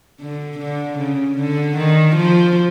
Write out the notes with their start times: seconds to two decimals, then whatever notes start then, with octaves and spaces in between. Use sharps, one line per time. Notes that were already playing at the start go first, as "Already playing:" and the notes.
0.21 D3
0.59 D3
0.98 C#3
1.38 D3
1.77 D#3
2.16 F3